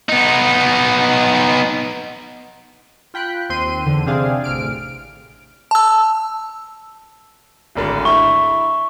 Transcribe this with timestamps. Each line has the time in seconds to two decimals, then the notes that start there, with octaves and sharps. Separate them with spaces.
0.09 B3 D#4
3.14 F4 G5 B5 F#6
3.49 D#2 C4 C6 D#7
3.86 E2 D3
4.06 C3 C4 D4 G#4 F5
4.44 A1 C3 F6 D7
5.71 A5 E6
7.75 D1 G#1 D3
8.05 E4 E5 C#6